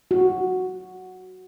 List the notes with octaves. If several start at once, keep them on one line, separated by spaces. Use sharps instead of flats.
F#4